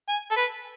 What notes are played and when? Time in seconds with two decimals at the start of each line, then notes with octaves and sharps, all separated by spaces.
0.08 G#5
0.31 A4
0.36 B4